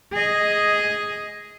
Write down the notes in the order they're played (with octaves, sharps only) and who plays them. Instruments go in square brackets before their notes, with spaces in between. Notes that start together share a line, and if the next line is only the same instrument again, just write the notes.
[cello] G#4 D#5